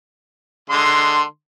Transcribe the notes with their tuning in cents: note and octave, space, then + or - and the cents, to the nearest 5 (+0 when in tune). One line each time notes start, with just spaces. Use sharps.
D3 +15 G#3 +20 C6 +0